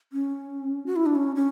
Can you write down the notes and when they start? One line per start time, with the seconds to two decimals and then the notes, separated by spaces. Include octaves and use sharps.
0.13 C#4
0.86 F#4
0.96 E4
1.06 D4
1.15 C#4
1.36 C#4